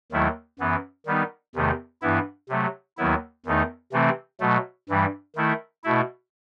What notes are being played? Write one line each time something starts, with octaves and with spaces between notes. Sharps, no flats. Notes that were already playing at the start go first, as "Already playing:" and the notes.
D#2 D#3 F#3 A3 E4
F#2 E3 B3
D#3 G3 B3 D#4
E2 C3 D#3 A3
G2 E3 B3 E4
C3 F#3 A3
D#2 D#3 F#3 B3 E4
E2 D#3 A3 D#4
C3 E3 A3 C4
B2 F#3 A3
G2 E3 G3
D#3 A3 E4
B2 A3 E4